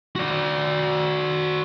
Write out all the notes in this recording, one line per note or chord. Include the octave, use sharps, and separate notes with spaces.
F#4 D5